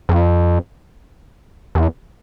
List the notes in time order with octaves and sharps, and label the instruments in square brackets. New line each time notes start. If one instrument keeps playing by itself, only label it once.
[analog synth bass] F2
E2